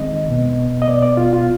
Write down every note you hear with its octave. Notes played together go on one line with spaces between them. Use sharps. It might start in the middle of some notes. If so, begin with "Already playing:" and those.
Already playing: D#3 G#3 C4 D#5
B2 B3
D#5
B2 B3 D5
D5
F4
F4